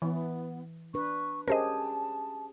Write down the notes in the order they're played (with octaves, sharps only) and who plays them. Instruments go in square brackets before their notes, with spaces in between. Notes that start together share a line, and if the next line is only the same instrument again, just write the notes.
[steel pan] E3 [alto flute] B3
[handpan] D4 B4 [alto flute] C#6
[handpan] C#4 G4 G#4 [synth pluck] A#4 C5 D#5 [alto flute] A5